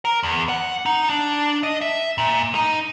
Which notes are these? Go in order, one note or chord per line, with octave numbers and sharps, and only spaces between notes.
A#4
E2
F#5
D#4
D4
D#5
E5
A#2
D#4